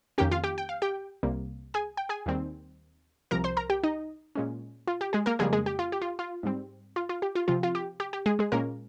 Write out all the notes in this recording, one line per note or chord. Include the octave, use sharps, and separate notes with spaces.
F2 D#3 A#3 C#4 G4 G5
F4 F5
G4 G5
G5
F5
G4 G5
C2 C3 G3 A#3
G#4 G#5
G5
G#4 G#5
D#2 D#3 G3 C4
C2 C3 F3 A#4 A#5
C5 C6
A#4 A#5
G4 G5
D#4 D#5
A#2 G#3 C#4
F4
G4
G#3 G#4
A#3 A#4
F2 C#3 G3 G#3 A#3 G#4
G#3 G#4
G4
F4
G4
F4
F4
G#2 G3 C4
F4
F4
G4
F4
C3 F3 C4 F4
F4
G4
G4
G4
G#3 G#4
G#3 G#4
A#2 G#3 A#3 C#4 A#4